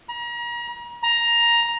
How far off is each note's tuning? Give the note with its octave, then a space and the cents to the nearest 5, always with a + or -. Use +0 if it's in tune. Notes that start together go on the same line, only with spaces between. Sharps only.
A#5 +35
A#5 +10